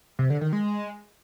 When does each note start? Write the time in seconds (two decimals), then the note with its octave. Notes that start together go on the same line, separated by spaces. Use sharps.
0.19 C3
0.30 D3
0.41 D#3
0.53 G#3